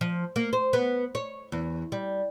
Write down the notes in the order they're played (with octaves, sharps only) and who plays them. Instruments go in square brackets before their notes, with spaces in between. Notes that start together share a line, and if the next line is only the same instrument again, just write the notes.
[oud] F3
A#3
C5
B3
C#5
E2
G3